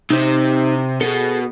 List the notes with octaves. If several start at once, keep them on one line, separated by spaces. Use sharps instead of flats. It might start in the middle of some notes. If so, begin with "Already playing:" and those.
C3 D#4 C5
B2 G#4 A4